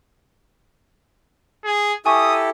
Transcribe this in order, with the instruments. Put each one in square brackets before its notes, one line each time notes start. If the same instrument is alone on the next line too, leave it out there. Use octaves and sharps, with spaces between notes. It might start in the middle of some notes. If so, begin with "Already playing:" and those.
[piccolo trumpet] G#4
[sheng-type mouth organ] E4 G4 A4 [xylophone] G#5 C#6 [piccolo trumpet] D#6